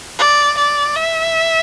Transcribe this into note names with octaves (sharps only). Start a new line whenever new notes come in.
D5
D5
E5